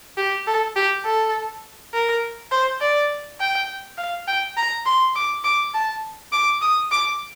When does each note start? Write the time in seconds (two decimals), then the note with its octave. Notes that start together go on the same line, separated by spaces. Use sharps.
0.18 G4
0.47 A4
0.76 G4
1.05 A4
1.94 A#4
2.51 C5
2.81 D5
3.40 G5
3.98 F5
4.27 G5
4.57 A#5
4.86 C6
5.15 D6
5.44 D6
5.74 A5
6.33 D6
6.62 D#6
6.91 D6